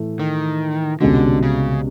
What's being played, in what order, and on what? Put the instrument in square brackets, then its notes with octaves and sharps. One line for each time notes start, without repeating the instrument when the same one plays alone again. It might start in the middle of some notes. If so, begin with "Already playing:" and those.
Already playing: [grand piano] A2 E3 A3
[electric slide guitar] D#3
[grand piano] C2 B2 G#3 C#4 F#4 [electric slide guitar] D3
[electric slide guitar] C#3